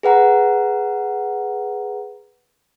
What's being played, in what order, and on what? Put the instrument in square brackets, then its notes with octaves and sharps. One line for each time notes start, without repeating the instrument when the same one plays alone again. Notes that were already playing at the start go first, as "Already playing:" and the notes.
[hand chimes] G#4 B4 F#5 A#5